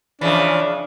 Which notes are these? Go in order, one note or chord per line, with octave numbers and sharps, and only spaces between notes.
C#3 E3 F3 D4